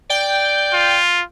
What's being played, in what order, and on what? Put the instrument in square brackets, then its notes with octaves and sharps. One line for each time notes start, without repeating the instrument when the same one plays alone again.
[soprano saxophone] D5 [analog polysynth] G5
[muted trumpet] F4